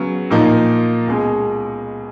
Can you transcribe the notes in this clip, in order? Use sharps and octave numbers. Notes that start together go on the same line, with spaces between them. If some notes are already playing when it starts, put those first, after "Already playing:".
Already playing: C#3 F#3 B3
A#2 F3 A#3 D#4
C#2 B2 G#3